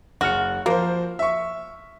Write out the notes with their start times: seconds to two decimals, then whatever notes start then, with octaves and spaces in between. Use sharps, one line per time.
0.21 F#1 F#4 F6 C#7
0.66 F3 A#3 C5
1.19 E5 C#6